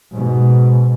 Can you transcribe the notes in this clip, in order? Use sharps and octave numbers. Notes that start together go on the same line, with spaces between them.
G#2 B2